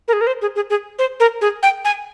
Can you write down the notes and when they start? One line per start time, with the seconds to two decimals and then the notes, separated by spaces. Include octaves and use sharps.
0.08 A#4
0.13 G#4
0.21 A#4
0.27 C5
0.42 G#4
0.56 G#4
0.70 G#4
0.99 C5
1.20 A#4
1.41 G#4
1.63 G5
1.85 G#5